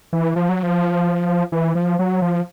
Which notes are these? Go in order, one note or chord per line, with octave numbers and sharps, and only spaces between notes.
E3
F3
F#3
F3
E3
F3
F#3
F3